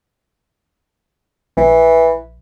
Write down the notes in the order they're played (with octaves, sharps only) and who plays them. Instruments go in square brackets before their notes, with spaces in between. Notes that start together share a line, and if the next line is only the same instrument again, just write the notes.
[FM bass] A#1 [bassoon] E3